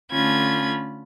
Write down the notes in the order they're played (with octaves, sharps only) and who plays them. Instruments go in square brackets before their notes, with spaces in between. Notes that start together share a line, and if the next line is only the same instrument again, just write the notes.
[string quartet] D3 A3 C#4 F4 B5 G#6